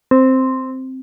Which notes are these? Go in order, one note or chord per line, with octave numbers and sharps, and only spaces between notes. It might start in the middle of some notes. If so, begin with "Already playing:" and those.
C4